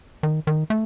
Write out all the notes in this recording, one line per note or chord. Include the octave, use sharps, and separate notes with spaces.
D#3
D#3
A3